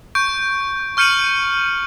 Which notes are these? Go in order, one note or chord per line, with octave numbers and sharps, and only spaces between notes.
C#6 G6 D7
C#6 F6 G6 C#7 D#7 F#7